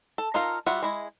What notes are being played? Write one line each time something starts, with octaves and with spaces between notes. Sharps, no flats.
A4
D#4 F4 A4 A#4 F5
G3 F4 F#4 E5 F#5
G#3 E4 D#5